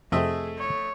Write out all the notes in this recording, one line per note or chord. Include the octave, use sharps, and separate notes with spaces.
F2 C3 A3 C4 G#4 D#5 E5
C#5